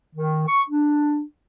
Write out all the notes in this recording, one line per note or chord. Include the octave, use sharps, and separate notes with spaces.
D#3
C#6
D4